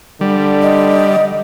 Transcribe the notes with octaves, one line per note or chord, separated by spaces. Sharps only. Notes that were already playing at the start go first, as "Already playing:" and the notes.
D3 G3
D#5